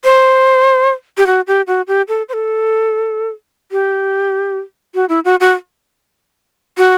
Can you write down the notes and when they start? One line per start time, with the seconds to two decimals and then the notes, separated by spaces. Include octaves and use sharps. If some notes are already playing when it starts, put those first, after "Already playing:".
0.04 C5
1.18 G4
1.27 F#4
1.47 G4
1.67 F#4
1.88 G4
2.08 A4
2.29 C5
2.33 A4
3.72 G4
4.95 F#4
5.09 E4
5.25 F#4
5.41 F#4
6.78 F#4